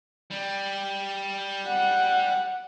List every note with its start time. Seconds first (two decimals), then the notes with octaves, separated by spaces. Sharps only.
0.30 G3
1.67 F#5